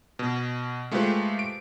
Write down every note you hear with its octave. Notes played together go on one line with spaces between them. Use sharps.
B2
G#3 A3 F4 G4 B4 C5
D7